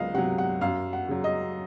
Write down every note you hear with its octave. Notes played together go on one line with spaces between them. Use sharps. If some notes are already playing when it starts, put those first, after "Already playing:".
Already playing: C#2 F#3 D#5 F5
C3 F#3 F#5
F#5
F#2 F5
F#5
C#3 F#3
D#5